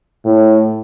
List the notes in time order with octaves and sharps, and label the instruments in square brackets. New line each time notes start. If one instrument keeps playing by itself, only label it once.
[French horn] A2